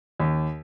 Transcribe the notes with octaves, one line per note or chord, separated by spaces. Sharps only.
D#2